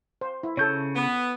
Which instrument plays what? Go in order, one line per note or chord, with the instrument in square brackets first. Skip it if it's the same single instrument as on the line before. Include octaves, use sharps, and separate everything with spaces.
[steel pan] C5
E4
[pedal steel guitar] C#3 G6 [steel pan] A4 C#5
[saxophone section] B3